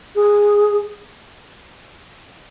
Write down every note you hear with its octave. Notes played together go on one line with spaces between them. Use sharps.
G#4